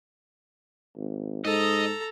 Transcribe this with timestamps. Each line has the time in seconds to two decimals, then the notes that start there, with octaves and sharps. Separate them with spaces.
0.97 G#1
1.45 G#2 A4 D#5 A#5